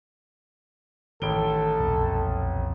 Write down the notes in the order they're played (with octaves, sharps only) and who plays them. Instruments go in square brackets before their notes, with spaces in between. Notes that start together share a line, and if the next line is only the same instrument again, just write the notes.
[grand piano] A1 D7 G7 [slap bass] D#3 [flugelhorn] A4
[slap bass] B1 F2 A#2